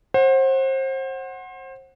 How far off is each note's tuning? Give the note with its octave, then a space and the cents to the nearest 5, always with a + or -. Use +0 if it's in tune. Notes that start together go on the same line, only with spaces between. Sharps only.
C5 +30 F#5 +0